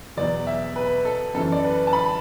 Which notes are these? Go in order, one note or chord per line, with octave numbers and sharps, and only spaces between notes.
E2 B2 F#3 D5
E5
B4
A4
F#2 E3 A4
D5
B4
A5
B5